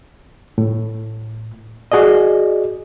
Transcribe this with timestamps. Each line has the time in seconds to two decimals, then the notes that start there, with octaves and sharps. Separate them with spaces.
0.58 A2
1.92 F#4 G#4 D5 D#5